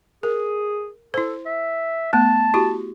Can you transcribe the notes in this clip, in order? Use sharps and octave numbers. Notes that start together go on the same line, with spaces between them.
G#4 A#4
E4 A4 C5
E5
A3 B3 A5
E4 F#4 G4